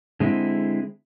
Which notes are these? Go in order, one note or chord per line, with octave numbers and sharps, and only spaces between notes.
D3 G#3 C4 E4